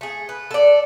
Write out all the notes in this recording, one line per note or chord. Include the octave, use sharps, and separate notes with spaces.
A3 G#4
B4
A4 D5